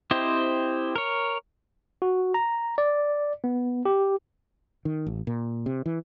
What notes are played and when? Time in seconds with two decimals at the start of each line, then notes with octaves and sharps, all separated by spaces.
0.11 C4 E4 G4 C5 D#5
0.96 A#4 C#5
2.02 F#4
2.34 A#5
2.78 D5
3.44 B3
3.85 G4
4.85 D#3
5.07 A1
5.27 A#2
5.66 C3
5.86 E3